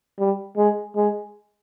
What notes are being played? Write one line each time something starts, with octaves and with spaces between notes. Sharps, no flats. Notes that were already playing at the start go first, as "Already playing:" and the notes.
G3
G#3
G#3